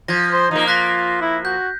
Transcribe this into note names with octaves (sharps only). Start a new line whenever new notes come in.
F3 G#6 A#6
C5
F3 A#3 D#4
F4 F#6 A#6 B6
E4
F#4 G6